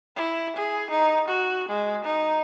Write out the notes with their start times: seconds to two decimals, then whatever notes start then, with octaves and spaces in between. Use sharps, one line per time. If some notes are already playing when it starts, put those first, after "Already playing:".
0.16 E4
0.56 G#4
0.90 D#4
1.28 F#4
1.69 G#3
2.05 D#4